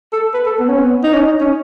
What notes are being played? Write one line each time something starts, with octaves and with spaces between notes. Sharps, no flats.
A4
B4
A4
B3
C#4
B3
D#4
C#4
D#4
C#4